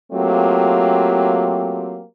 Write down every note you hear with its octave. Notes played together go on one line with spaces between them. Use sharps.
F#3 A3 A#3 C4 F4 G4